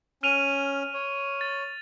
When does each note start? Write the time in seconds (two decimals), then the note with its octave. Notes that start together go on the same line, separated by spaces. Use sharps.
0.23 C#4 F6 D#7 F7
0.94 C#5
1.41 A6